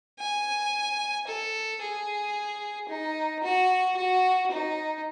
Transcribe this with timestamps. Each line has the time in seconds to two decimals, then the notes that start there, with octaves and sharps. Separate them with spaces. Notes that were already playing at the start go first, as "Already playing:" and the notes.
0.20 G#5
1.27 A4
1.81 G#4
2.89 D#4
3.44 F#4
3.96 F#4
4.51 D#4